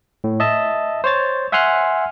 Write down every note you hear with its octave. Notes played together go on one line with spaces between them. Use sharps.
A2
D#5 E5 A5
C5 C#5 A6
E5 F#5 G#5 C6 F6 F#6